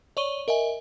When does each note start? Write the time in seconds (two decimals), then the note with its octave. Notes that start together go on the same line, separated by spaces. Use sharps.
0.17 C#5 D5 C#6 D#7 G7
0.48 A#4 D#5 E5 G#5